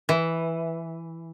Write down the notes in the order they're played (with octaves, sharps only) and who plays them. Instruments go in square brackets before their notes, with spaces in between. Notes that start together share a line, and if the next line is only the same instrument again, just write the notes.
[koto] E3